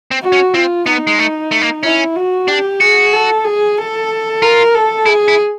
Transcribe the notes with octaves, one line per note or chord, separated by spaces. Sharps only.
C4
F#4
C#4
C4 F4
B3 D#4
G#3
A3
A3
A#3
C#4 E4
F#4
D4 G4
F#4 G#4
A4
G#4
A4
F4 A#4
A4
E4 G#4
E4